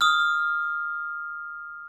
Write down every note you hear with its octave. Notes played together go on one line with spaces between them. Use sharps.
D#6 F6